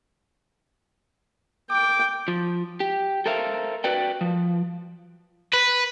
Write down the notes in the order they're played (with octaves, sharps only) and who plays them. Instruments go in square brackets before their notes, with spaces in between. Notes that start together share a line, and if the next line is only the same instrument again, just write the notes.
[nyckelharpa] G5 [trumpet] D6
[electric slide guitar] F3
G4
A4 A#4 C5 E5 F5
F#4 B4 D5 G5
F3
[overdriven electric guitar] B4